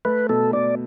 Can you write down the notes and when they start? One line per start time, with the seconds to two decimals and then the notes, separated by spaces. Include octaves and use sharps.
0.05 A3 B4
0.29 B2 A4
0.53 B2 D5